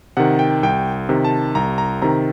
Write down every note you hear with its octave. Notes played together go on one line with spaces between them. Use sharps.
C3 D#3 F#5
G5
C2 G5
C3 D#3
A5
C2 A#5
A#5
C3 D#3 A#5